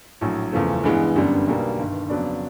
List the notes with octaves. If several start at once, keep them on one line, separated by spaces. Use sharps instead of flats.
A#1 A2 F#3
F#1 E2 C#3 F3 A3
G2 E3 G#3 B3
G1 F#2 D3 G3 B3
B1 B2 G3 A#3
G1 G2 D#3
F2 C#3 F#3 B3 D4